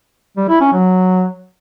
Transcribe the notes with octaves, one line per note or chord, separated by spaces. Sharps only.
G3
E4
C#4
F#3